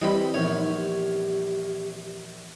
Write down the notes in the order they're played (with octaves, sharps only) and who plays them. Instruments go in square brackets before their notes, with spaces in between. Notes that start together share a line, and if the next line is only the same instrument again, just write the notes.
[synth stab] E3 G3 C4 [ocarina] G4 [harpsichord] D#5 B5
[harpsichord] A#1 E2 C#5 [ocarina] D#4
[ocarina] G4